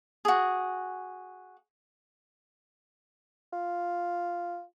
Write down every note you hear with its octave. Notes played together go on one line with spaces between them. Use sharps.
F#4 G#4
F4